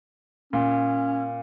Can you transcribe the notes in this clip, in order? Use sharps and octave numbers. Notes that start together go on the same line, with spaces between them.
A#2 C#4